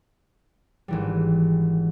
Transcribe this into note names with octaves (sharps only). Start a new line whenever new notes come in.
G#1 E3 G3